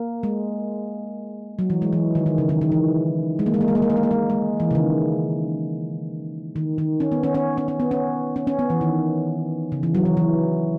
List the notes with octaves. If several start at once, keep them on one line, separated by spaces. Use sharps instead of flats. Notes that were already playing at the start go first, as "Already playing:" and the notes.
Already playing: A#3
G#3
F#3
E3
G#3
E3
D#3
D#3
C#3
D#3
D#3
E3
G#3
A#3
G#3
A#3
G#3
A#3
G#3
A#3
G#3
A#3
G#3
G#3
E3
C#3
D#3
D#3
D#3
C#4
B3
C#4
C#4
C#4
C#4
B3
C#4
C#4
C#4
B3
E3
D#3
C#3
E3
F#3
E3
E3